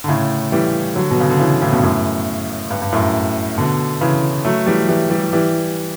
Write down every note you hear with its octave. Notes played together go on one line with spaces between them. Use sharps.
D3
A2 C#3
E3 G3
D3 F#3
B2
C#3
D3
C#3 E3
A2 C#3
G2 B2
F#2 A2
G2
G2
F#2 A2
B2 D3
C#3 E3
F#3 A3
E3 G3
E3 G3
E3 G3
E3 G3